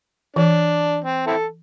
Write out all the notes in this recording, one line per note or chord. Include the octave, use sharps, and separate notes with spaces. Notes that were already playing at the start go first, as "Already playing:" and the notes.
E3 D4
C4
C4 E4 A4